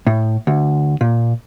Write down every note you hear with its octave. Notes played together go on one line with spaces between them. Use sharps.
A2
D2
A#2